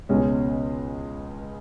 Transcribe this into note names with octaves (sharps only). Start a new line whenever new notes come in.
C#2 B2 G#3 C#4